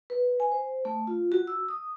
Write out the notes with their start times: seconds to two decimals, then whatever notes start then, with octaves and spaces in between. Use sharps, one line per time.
0.10 B4
0.40 G#5
0.52 C5
0.85 A3
1.07 F4
1.32 F#4
1.47 E6
1.69 D#6